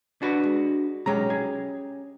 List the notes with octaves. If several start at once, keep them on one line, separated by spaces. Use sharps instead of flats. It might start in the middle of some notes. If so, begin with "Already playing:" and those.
D4 F#4 B4
G#3
B1 F#3 G#3 C#4 G4 A#5
G#4